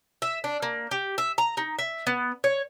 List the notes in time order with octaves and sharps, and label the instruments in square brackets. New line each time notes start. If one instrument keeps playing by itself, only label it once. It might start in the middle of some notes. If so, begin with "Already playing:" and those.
[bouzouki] E5
D4
A#3
G4
E5
A#5
D#4
E5
B3
C#5